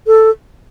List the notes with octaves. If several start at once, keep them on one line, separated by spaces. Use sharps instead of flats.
A4